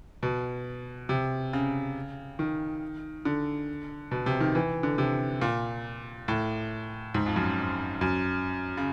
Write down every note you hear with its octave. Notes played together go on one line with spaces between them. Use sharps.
B2
C3
C#3
D#3
D3
B2
C3
D#3
E3
D3
C3
A#2
A2
G#2
F2
F#2
F#2
C#3